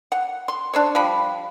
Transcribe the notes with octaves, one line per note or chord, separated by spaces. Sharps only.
F#5
C6
D4 C5 C#5
F3 G3 B5